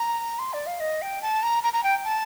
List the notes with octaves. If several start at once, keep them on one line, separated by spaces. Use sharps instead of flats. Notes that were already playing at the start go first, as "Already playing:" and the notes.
Already playing: A#5
C6
D5
F5
D#5
G5
A5
A#5
A#5
A#5
G5
A5